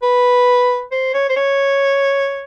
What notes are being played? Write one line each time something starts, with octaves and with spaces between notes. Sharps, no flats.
B4
C5
C#5
C5
C#5